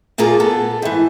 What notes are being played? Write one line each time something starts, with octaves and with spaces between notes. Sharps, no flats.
A#2 A#3 F4 G#4 A4 A#5
B3 A4
G#2 E3